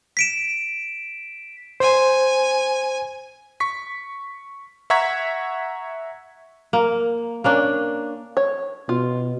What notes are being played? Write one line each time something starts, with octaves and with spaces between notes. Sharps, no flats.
B6 D7 E7
C5 G#5
C#6 B6
E5 F#5 A#5 C#6 G#6 B6
A#3
A#3 C#4 D4
C#5
B2 F4